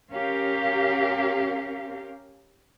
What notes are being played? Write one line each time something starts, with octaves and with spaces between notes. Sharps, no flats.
C#4 G4 A#4 F5